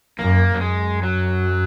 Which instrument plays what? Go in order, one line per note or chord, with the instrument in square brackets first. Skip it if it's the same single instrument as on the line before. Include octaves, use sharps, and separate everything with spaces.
[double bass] F#2 [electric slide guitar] A#3
[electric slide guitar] F#3
[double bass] F#2 [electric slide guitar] G#3
[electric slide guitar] F#3